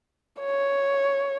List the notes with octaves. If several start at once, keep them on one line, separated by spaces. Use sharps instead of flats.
C#5